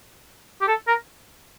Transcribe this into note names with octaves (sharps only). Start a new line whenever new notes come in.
G4
A4
A#4